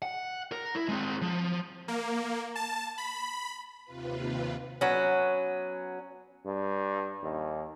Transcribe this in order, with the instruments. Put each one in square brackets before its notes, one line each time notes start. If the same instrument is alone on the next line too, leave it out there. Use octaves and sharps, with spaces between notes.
[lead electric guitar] F#5
A#4
E4
G#3 C4
F3
[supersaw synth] A#3
A5
B5
[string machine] D#2 C3 F4 B4
[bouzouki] F#3 B3 C#4
[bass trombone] G2
D#2